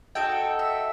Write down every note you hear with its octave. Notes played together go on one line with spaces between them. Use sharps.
D#4 F#4 A4 G5
E5